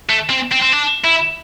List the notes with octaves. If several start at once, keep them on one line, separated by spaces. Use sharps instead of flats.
A3
C4
C4
C4
D4
E4